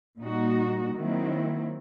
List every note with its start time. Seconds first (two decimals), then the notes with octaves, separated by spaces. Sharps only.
0.19 A#2 G3 D#4 F#4
0.96 D#3 F#3 A#3 C4 E4